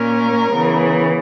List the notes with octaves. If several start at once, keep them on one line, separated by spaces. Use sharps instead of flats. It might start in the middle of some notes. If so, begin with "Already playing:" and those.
Already playing: A#2 A#3 C#4 A#4
C#3 E3 B3